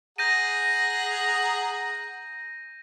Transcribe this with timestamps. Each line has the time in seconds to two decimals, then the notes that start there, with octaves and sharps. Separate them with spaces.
0.18 G#4 F#5 A#5 G6 A#6 D#7